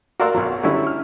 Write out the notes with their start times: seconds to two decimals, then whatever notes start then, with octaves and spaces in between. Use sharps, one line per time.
0.20 F#4 A#4 D5 F5 C6 E6
0.34 B1 F#3
0.63 D3 F#3 G3 C#4 E4
0.87 F6